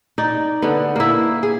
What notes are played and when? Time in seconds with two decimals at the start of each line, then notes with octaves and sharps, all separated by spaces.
0.18 D#4 D5
0.62 D3 B3
0.96 A#3 E4
1.43 G#4